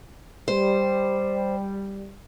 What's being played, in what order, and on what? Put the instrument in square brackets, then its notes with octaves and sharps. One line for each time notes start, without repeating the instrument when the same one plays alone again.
[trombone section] G3 [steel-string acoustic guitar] C5